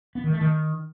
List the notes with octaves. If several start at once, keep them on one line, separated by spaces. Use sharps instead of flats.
B3
D#3
A3
D#3